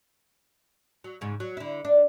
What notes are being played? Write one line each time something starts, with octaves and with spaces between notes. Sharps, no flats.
F#3
G#2 C#3
F#3
D3 E4
D4